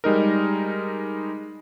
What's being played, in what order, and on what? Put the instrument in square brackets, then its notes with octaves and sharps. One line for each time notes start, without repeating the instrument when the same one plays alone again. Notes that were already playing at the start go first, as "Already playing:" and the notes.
[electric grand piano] G3 G#3 D#4 A#4